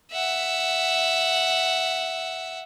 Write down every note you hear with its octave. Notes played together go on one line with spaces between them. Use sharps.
E5 F#5